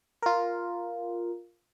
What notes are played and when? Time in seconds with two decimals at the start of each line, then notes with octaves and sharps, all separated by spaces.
0.22 F4 A#4